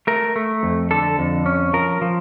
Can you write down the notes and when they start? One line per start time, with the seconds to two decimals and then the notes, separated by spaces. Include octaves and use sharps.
0.07 A3 A#4
0.36 A3
0.63 F2
0.91 D3 A4
1.19 F2
1.46 C#4
1.73 F3 A#4
2.02 F3